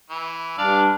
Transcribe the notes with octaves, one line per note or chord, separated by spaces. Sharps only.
E3
G2 D4 D5 F5